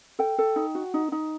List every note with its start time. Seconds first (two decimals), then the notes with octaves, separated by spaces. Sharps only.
0.19 A4 G5
0.38 A4
0.56 D#4
0.75 F#4
0.94 D#4
1.12 D#4